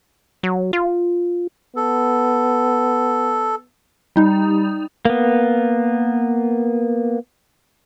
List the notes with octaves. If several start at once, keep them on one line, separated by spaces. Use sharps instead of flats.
F#3
F4
B3 A4
G3 D#4
A#3 B3